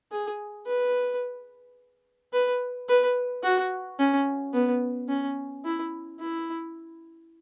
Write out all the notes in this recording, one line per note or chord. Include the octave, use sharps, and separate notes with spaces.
G#4
B4
B4
B4
F#4
C#4
B3
C#4
E4
E4